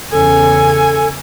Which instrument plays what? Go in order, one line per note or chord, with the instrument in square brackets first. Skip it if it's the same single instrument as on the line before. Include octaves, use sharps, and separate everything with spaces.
[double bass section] E2 C#3 [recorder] A4 [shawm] G#5